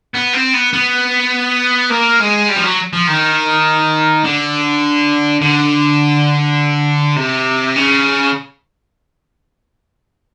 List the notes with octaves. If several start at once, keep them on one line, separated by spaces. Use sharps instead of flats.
B3
C4
B3
B3
A#3
G#3
G3
F3
F#3
F3
D#3
D3
D3
C3
C#3